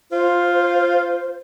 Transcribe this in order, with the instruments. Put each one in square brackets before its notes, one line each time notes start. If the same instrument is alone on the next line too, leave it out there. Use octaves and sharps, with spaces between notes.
[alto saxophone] F4 [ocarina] C5